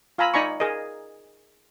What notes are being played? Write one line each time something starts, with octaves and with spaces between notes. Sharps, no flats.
F4 F5 G#5 A#5 B5 E6
D#4 D5 G#5 A#5 B5 C#6
G#4 A#4 D#5